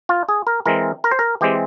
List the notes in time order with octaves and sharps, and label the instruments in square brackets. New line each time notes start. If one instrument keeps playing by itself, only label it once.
[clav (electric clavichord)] F4
G#4
A#4
E3 G#3 C4 A#4
A#4
C5
A#4
E3 G#3 C4 G4